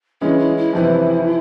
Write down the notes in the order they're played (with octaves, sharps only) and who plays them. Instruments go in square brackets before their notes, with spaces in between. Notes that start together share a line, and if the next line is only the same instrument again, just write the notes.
[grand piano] C#3 E3 G#3 C#4 [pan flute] E4
[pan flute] E4
E4
[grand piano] F2 C3 E3 [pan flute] E4